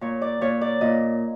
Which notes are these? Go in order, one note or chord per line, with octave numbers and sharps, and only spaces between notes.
A#2 C#5
D5
A#2 C#5
D5
A#2 D#5